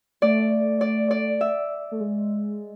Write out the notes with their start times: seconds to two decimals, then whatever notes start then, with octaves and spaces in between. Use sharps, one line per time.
0.22 A3 D5
0.81 D5
1.11 D5
1.41 E5
1.92 A3
2.01 G#3